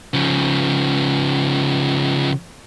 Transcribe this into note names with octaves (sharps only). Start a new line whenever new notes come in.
C#3 F3